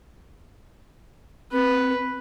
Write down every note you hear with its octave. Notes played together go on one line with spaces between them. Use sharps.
C4 B4